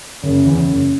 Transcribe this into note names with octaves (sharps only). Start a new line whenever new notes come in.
F#1
E2 C#3
F#1